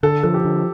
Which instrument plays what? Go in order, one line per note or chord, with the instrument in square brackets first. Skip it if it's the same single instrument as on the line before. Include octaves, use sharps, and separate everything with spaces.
[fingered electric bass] D3 [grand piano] A4
[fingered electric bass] F3 [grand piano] A4
[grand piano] G4
[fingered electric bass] D3